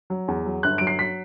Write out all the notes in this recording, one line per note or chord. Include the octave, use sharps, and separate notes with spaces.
F#3
E2
F#3
G1 F#6
F#3 D7
C7
F#3 B6